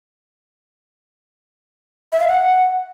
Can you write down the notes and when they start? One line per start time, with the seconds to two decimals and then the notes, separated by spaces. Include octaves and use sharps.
2.12 E5
2.20 F5
2.28 F#5